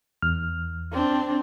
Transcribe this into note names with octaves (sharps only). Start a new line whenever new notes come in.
E2 F6
C4 D4